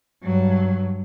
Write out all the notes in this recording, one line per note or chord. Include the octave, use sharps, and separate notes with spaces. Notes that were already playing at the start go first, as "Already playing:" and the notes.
G2 F#3